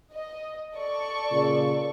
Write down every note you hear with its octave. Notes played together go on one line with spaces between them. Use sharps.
D#5
A4 D5 C#6
A#2 C#3